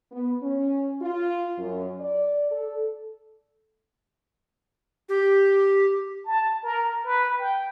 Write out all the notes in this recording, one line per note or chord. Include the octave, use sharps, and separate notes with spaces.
B3
C#4
F4
F#2
D5
A4
G4
A5
A#4
B4
G5